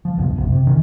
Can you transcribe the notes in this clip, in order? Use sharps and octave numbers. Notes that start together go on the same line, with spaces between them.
F3
C#2 F#2 B2
F1 A#1 F#2 C3
C3
F1 D#3 E3